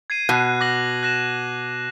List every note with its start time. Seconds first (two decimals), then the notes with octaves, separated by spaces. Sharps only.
0.10 G#6 C7 D#7
0.29 B2 F#6
0.61 D6 A#6 F#7
1.03 F#6 A#6 E7